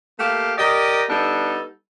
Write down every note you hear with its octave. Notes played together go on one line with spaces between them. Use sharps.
A3 A#3 G4 F5
G4 A#4 D5 D#5
G3 B3 D4 D#4 A4